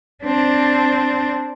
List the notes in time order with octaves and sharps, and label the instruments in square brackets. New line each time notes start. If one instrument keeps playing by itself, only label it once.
[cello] C4 D4